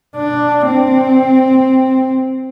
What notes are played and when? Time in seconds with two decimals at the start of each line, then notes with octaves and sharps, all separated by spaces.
0.17 D4
0.68 C4